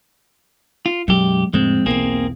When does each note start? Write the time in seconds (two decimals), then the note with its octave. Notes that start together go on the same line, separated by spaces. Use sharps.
0.86 F4
1.08 B1 F#2 F#3 G#3 G4
1.53 F2 A2 D3 G#3 C4
1.86 B1 E2 A#3 C4 G#4